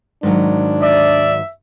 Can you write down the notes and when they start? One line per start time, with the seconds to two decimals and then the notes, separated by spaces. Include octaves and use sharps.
0.23 G#2 D#3 F#3 D4
0.82 D5 E5